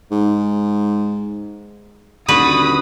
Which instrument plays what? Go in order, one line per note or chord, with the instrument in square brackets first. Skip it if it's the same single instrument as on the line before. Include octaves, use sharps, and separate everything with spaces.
[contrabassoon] G#2
[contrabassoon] D#1 [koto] D3 F#4 B4 [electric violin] B5 D#6